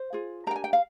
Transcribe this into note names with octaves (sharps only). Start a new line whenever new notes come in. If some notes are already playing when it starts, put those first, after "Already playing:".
Already playing: C5
F4 G#4
D4 G4 A#4 G5 A#5
G#5
G5
F5